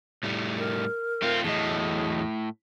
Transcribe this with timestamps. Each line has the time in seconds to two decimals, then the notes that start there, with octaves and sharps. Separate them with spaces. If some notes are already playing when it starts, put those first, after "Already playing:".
0.23 A2 G3 A3
0.58 A#4
1.22 A3 C4 F4
1.44 E2 A2 F#3 G#4 D#5